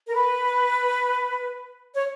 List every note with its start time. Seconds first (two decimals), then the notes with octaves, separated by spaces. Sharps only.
0.08 A#4
0.15 B4
1.95 C#5